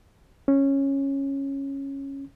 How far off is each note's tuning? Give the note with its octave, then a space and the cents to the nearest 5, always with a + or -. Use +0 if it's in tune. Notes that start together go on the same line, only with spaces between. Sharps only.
C#4 -10